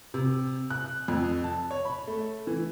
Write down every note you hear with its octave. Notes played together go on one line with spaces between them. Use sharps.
C3
F#6
F2
A5
C#5
B5
A3
E3